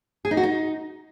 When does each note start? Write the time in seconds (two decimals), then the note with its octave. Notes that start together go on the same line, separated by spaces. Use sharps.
0.25 G#4
0.31 D#4
0.37 F#4
0.43 D#4